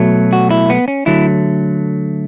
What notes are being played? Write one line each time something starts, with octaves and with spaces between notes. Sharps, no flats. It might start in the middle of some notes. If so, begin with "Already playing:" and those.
Already playing: B2 F#3 A3
F#4
E4
B3
C#4
D3 F#3 A3 E4